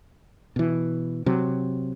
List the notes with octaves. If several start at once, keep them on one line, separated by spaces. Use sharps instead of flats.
B2 E3
C3 F#3